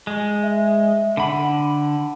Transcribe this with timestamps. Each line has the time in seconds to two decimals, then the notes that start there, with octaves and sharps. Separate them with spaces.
0.07 G#3
0.43 E5
1.17 D3 F#5 B5